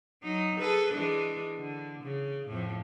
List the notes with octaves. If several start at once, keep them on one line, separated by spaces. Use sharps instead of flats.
F#3 D#4
G#4 A4 B4
E3 G#3 D4
D3
C#3
F2 A2